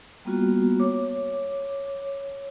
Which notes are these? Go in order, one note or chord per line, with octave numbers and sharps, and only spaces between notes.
G3 A#3 B3 F4 F#4
C#5 D6
C#5